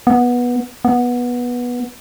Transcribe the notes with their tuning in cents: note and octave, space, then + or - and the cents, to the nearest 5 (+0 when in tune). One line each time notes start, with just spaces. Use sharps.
B3 -15
B3 -15